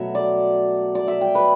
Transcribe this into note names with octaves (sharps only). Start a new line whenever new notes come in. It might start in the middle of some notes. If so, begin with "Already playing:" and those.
Already playing: B2 F#3 A3 E5
D5
D5
E5
G5
B4